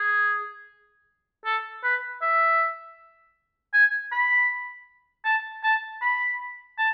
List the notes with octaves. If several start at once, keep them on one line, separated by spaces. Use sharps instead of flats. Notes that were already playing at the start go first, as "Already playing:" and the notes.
Already playing: G#4
A4
B4
E5
G#5
B5
A5
A5
B5
A5